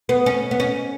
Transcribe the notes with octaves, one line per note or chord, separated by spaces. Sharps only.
B3
C#4
B3
C#4